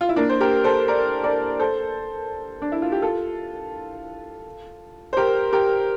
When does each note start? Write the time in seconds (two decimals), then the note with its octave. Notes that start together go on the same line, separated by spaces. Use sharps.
0.01 F4
0.09 E4
0.16 A#3 D4
0.29 C5
0.40 G4 A#4
0.64 A4 C5
0.88 A#4 D5
1.24 A#4 D5
1.59 A4 C5
2.62 D4
2.72 E4
2.82 F4
2.92 G4
3.02 F4 A4
5.13 C5
5.17 G4 A#4
5.53 G4 A#4